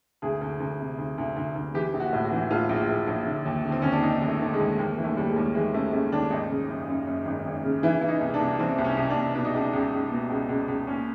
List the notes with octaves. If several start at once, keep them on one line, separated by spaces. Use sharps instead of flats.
D2 G#4
D2
D2
C3
D2
D2
D2
D2
E3 G4
A#1
F#4
A2
F#4
E3
A2 F4
A#1
A#1
A#1
D3
D#2
D3
C4
D#2 C#4
D4
D#2 D#4
D#2
A3
D3 A3
G#3
D#2
D#2 A#3
E3
A3
D#2 G3
G#3
D#2
E3 G#3
C#3 A3
C#3 A3
D#2 D4
G#1 D#4
C#3
F#2
F#2
F#2
G#1
G#1
C#3
E3 E4
E3 E4
D#4
C2
D4
C2
E3 C4
C2
C#4
C2
D4
C2
B2 D4
D#4
C#2 D4
C#2
C#2
B2
C#2
C#2
C#2
A#2 C#4